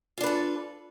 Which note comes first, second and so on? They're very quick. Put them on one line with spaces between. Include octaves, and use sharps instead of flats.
F4 D4 B4 A4